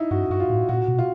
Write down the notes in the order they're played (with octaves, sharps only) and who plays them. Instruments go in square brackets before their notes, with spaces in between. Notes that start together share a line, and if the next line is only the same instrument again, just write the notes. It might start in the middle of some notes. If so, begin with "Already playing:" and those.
Already playing: [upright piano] D#4 E4
[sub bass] G2 [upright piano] F#4
[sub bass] G2 [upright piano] F#4
[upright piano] F4
[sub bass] A2
[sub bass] A#2 [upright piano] F#4
[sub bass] B2
[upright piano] F4